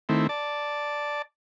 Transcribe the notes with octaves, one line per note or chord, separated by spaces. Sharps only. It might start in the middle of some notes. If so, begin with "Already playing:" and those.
D#3 A3 C4 E4
D5 A5